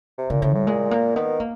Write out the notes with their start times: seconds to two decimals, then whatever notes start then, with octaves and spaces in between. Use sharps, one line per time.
0.18 C3
0.30 A#2 C#3
0.42 A2 C#3
0.55 A2 G3
0.67 A#2 G#3
0.91 A#3
1.15 D#3 B3
1.40 A#3